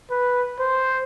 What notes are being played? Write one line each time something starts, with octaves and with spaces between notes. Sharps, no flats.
B4
C5